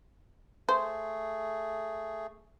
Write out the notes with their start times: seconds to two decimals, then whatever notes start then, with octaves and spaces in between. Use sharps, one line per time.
0.69 A3 G#4 C5